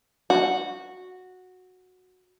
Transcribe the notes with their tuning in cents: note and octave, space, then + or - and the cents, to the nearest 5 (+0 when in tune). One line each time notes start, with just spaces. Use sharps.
F#4 -10